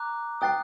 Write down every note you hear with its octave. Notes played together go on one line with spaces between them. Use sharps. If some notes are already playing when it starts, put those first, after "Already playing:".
Already playing: A#5 D6 F#6
G5 D#6 F#6 A6 C7